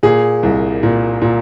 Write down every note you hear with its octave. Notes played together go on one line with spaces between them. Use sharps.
A#2 G#4
C2
A#2
A#2